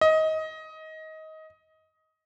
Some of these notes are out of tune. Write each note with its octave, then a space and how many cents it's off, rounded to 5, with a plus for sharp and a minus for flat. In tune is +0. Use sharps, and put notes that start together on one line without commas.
D#5 +20